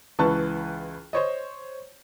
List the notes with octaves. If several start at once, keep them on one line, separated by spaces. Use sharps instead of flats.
C#2 E3 B4 A5 C#6 F#6
C5 C#5 D#5